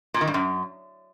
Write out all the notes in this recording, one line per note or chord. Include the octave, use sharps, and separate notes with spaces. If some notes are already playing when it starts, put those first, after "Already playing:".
A#2
D#3
G2
F#2